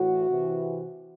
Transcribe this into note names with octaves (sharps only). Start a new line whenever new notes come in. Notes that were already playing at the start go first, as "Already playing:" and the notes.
Already playing: A2 E3 F#4
C3 E3